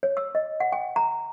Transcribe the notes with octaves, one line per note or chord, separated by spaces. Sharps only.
C#5
E6
D#5
F#5
G5
A#5